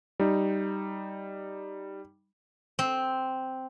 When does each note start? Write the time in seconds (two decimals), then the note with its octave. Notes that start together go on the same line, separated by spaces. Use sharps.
0.20 G3 D#4
2.79 C4